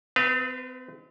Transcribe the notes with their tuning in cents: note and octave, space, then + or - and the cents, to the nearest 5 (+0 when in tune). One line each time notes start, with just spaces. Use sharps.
C4 -40 B4 +0 F5 -25